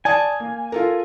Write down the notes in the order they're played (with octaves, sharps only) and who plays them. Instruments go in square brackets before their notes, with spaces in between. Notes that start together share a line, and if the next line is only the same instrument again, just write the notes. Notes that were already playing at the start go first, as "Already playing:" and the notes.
[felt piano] D5 A5 D#6 [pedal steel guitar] G#5
[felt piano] A#3
F4 A4 A#4